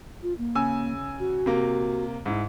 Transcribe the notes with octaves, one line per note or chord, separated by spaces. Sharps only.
F4
A#3
C#3 G#5 E6
F#4
C3 A#3
G#2 E4